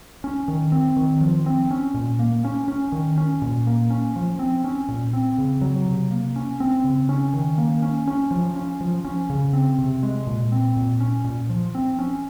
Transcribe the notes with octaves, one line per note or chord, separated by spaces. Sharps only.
C#4
D#3
C4
D#3
F3
C4
C#4
A#2
A#3
C#4
C#4
D#3
C#4
A#2
A#3
C#4
F3
C4
C#4
A#2
C4
C#3
F#3
C3
A#3
C#4
C4
C#3
C#4
D#3
A#3
C#4
C#4
F3
C#4
F3
C#4
C#3
C4
C3
G#3
A#2
C4
A#2
C#4
A#2
F3
C4
C#4